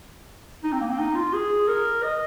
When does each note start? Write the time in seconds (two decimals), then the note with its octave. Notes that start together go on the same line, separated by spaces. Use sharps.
0.64 D#4
0.72 C4
0.81 A#3
0.90 C4
0.99 D#4
1.15 F4
1.33 G#4
1.68 A#4
2.03 D#5